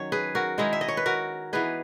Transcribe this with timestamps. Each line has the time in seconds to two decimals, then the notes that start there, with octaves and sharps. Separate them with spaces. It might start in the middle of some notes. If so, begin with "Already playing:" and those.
Already playing: D#3 F#3 C#4 C#5
0.12 G#4 B4
0.35 F#4 A#4
0.58 D#3 G#3 D#4 E4 G#4
0.73 E5
0.81 D#5
0.88 C#5
0.97 B4
1.06 F#4 A#4
1.53 E3 B3 D#4 G#4 B4